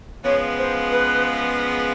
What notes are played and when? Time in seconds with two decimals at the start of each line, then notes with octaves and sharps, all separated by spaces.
0.24 C#3 F3 G#3 B3 C#5
0.58 C5
0.91 B4